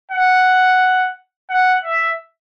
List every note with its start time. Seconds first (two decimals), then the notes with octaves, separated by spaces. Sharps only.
0.11 F#5
1.50 F#5
1.84 E5